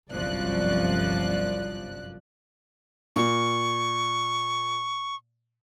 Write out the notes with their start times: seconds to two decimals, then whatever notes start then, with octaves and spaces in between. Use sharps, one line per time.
0.12 G1 C2 F#2 F3 D5 F#6
3.16 A#2 C#6